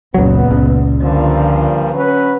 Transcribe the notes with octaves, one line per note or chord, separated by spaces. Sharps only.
F#1 C#2 A#2 F#3 B3
C#2
G2 A#2 D3 F3
F#3 C#4 B4